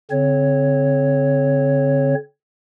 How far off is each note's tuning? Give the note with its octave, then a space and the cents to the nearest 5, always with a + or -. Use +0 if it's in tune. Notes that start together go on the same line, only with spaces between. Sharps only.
D3 -45 C4 +0 C#5 +0